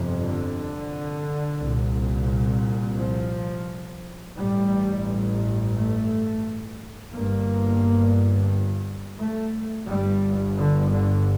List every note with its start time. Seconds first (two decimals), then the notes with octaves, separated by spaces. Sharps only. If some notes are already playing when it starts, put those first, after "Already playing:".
Already playing: G1 F2 C3
0.21 D3
1.60 C2 A#2
2.98 F3
4.35 A1 G2 G3
5.74 A3
7.12 G1 G2 A#3
9.19 A3
9.87 G1 G2 G3
10.57 D3
10.92 D3